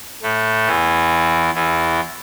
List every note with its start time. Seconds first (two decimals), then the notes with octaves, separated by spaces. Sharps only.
0.22 A2 A3
0.66 E2 E3
1.54 E2 E3